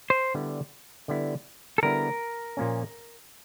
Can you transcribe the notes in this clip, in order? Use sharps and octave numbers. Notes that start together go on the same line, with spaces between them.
C5
D3 G3 B3 E4
D3 G3 B3 E4
A4
D3 G3 B3 E4 A#4
A#2 F3 A#3 C#4